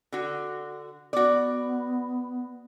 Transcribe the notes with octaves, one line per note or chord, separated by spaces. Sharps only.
D3 F#4
B3 F#4 D5